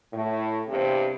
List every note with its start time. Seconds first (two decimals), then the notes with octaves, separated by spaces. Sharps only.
0.12 A2
0.68 E2 G2 C3 C4